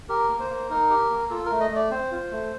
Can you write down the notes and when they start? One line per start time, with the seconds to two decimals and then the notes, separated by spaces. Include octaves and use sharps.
0.09 G4 A#4
0.29 A#3
0.40 C5
0.50 A#3
0.70 D#4 A#4
0.90 G4
1.11 A#3
1.30 F4 A4
1.46 A#4
1.51 A3
1.60 D#5
1.70 A3 D5
1.91 C4 C5
2.11 F4
2.31 A3